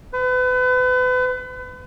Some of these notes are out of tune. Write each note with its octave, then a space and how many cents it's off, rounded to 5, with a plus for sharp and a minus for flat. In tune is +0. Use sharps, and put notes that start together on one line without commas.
B4 +35